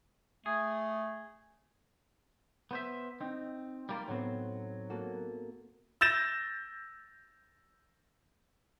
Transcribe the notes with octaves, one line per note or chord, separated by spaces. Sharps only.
A3 G#4
B3 C5 E5
C4 D#4
G3 A#3 F4
A2 F#3 B3 C4
A#3 F#4 A4
E6 G6 A6 A#6 E7